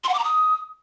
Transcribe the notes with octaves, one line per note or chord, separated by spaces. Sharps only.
C6
F#5
D6
A#5
D#6